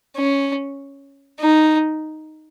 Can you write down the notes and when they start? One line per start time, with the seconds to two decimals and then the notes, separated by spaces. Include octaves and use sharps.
0.16 C#4
1.39 D#4